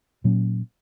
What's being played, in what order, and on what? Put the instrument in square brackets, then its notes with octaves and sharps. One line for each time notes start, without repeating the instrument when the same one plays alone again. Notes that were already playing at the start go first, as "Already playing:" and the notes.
[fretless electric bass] A#2 F#3 A#3 C#4